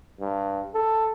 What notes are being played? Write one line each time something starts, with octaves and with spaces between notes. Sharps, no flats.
G2
A4